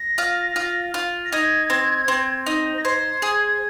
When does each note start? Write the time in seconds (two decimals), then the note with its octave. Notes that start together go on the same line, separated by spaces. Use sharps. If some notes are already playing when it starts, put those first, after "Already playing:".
Already playing: A#6
0.18 F4
0.56 F4
0.94 F4
1.25 A#6
1.32 D#4 G#6
1.70 C4
2.08 C4
2.47 D#4
2.78 A#6
2.84 C5 G#6
3.22 G#4